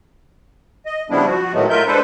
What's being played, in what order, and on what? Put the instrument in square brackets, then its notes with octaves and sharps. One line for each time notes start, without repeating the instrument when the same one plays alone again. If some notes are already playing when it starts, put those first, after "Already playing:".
[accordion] D#5
C#3 F3 G3 B3 D4 E4
F3 F#4
A2 D#3 F#3 G#3 A3 B3
A2 F4 A#4 E5 G6
G#3 D4 A4 B4 C5